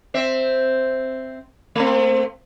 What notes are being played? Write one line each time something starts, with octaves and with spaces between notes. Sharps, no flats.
C4 E5
A3 C4